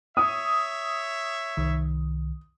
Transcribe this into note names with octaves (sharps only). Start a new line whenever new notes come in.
C#5 E5 D#6
C2 D#3